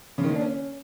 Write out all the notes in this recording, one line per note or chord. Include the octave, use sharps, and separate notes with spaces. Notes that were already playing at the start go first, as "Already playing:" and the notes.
C#3
D#3
A#3
D4
C#4